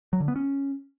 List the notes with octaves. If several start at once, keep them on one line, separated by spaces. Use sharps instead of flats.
F#3
D3
B3
C#4